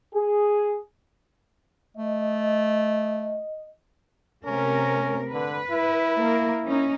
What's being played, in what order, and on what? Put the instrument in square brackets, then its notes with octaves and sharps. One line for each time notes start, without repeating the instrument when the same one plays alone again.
[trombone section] G#4
[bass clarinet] A3 [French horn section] D#5
[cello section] C3 A3 A#4 [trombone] C#4
[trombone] D3 [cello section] B4
[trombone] E4
[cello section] A#3 A#4
C#4 D#4